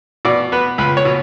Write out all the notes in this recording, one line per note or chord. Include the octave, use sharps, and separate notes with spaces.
B2 D5
B3 B4
C#2 B4
C#5
B2